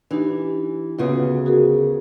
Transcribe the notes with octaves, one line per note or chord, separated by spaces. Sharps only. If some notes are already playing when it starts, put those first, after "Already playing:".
E3 D4 D#4 G4
D2 C#3 B3 F4
F#4 G#4 A#4